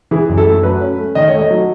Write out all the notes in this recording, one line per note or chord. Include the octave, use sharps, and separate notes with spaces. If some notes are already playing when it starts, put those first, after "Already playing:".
E3 G#4
F#2
A4
A3
F#3 B4
C#4
A3
D#3 D#5
C#5
A3 D#5
F#3